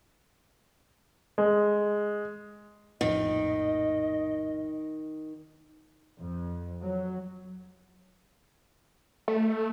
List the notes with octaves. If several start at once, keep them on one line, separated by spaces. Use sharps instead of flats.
G#3
A#1 F2 A2 D#3 D#5
F2
F#3
A3